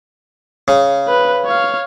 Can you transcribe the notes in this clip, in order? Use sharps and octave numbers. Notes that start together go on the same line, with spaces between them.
C#3
B4
C#5 F5